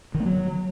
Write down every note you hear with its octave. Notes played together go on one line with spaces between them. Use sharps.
D#3
A#3
F#3